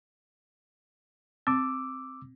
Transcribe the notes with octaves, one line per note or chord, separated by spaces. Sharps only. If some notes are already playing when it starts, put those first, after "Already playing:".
C4 D6 E6